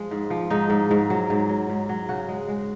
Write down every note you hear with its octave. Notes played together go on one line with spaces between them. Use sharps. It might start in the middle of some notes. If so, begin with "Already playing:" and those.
Already playing: F3 G#3
G#2
F3
G#2 D#4
G#2
G#2
F#3
G#2
F#3
G#2
F#3
C#3 F#4
G#3
G#3